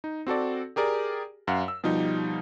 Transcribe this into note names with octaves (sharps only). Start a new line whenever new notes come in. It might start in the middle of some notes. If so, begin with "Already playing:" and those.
D#4
C4 F#4 A4 D5
G4 G#4 A#4 D5
F#2 F5 F#5
E6
B2 F3 G3 D#4